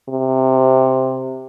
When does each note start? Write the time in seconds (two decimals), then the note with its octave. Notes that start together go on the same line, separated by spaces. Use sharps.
0.09 C3